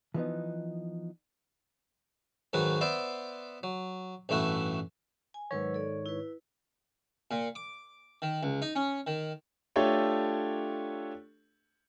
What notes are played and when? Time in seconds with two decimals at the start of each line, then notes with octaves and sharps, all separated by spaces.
0.14 E3 F3 B3 D#4
2.53 G#2 D#3 F#3 F#4 B4
2.81 B3 C5 D5 E5 B5
3.63 F#3
4.29 A1 G2 A3 E4 F#4
5.34 G#5
5.51 G#2 D#3 F#3 B4 C#5 E6
5.74 A4 D5
6.06 E4 B4
7.31 A#2
7.55 D6
8.22 D#3
8.43 C#2
8.62 D#4
8.76 C#4
9.07 D#3
9.76 A3 D4 F4 G4 A4 C#5